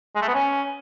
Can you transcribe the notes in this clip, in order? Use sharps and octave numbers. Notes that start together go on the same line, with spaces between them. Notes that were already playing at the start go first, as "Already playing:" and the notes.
G#3
A3
B3
C#4